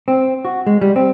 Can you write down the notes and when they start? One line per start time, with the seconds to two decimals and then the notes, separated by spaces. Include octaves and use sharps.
0.08 C4
0.45 F#4
0.67 G#3
0.81 G3
0.96 C4